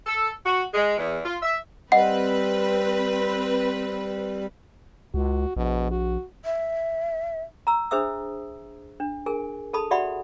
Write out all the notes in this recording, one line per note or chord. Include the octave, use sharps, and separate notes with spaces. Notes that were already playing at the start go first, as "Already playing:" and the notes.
A4
F#4
G#3
E2
F4
E5
G3 C4 B4 D#5 F#5 C7
C#2 F#4
A#1 B2
F#4
E5
A#5 E6
D4 G#4 C5 E5 D#6 E6
D4
G#4 A#4 G#5
G#4 A4 A5 B5 D#6
F#4 G4 D5 E5 F#5 B5